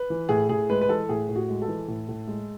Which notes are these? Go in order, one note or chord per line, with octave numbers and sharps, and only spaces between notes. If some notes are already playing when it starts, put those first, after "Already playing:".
Already playing: B4
E3
A2 G#4
A2 G#4
G#3 B4
B4
E3 A4
A2 G#4
A2
F#4
G#3
A4
E3
A2
A2
G#3